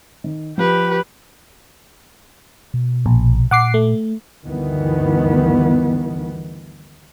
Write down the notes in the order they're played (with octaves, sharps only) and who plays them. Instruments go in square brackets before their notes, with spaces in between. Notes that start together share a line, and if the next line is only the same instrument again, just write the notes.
[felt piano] D#3
[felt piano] F3 [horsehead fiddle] G4 B4
[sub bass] B2
[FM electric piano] A#1
[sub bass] A#2 [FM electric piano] F#5 D6 C7
[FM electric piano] A3
[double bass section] D2 G2 D#3 E3 B3